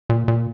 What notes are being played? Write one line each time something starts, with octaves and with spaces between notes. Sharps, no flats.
A#2
A#2